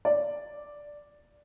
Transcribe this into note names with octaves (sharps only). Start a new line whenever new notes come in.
D5